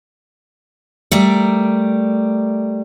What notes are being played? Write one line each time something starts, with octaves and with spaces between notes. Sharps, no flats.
G3 A3 A#4 D5